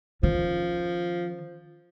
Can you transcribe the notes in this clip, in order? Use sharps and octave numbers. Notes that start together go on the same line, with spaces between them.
D#3 F3 C#4